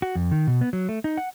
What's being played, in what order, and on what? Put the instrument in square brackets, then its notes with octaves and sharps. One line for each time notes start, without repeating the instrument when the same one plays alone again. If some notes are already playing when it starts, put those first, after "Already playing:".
[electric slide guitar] F#4
F2
D#3
B2
B3
F#3
A3
D#4
F#5